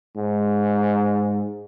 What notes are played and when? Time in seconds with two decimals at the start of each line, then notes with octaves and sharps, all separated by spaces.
0.17 G#2